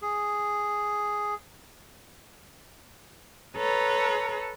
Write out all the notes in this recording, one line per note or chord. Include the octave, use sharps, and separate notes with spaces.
G#4
A4 B4 C#5 A#5